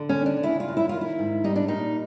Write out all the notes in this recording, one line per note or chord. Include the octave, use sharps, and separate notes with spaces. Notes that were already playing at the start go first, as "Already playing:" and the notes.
Already playing: D3
C#4
D#2
D4
C#3 E4
F4
F#2
E4
D#3 F4
E4
G#2
G3 D#4
D4
A#2 D#4